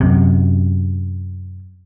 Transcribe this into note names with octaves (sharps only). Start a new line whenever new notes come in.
F#2 C3